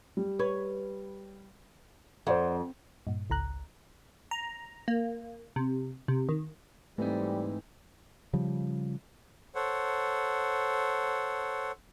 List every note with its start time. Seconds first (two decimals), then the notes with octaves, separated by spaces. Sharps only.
0.17 G3
0.39 B4 C#5
2.27 F2 C5 D5 F#5
3.07 G2 A#2
3.30 G#1 C#2 A#5 F#6
4.31 A#5
4.88 A#3
5.56 C3
6.08 C3
6.29 D#3
6.98 G#2 E3 G3 A3 C4 D#4
8.33 C#3 F3 G3
9.55 A4 C5 C#5 F#5